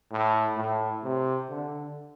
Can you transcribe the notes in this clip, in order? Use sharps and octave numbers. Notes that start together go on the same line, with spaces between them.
A2
A2
C3
D3